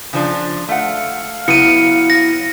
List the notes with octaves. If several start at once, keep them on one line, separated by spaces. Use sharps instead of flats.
C#3 F3 D4
A3 F5 F#5
C#3 F#3 B3 E4 C#7 D#7
A#6